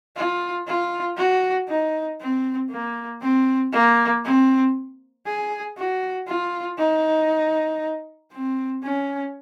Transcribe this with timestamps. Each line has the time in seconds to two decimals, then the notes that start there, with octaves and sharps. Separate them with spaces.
0.16 F4
0.67 F4
1.17 F#4
1.68 D#4
2.20 C4
2.71 A#3
3.21 C4
3.73 A#3
4.24 C4
5.26 G#4
5.77 F#4
6.28 F4
6.78 D#4
8.32 C4
8.83 C#4